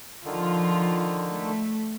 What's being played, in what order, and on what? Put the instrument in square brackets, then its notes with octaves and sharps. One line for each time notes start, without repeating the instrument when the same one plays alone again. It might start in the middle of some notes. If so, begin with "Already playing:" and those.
[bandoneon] D3 D#3 [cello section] F3 F4
[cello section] A3